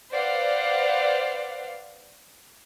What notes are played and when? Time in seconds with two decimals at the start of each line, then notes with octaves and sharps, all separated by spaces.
0.11 B4 C5 D5 F5 F#5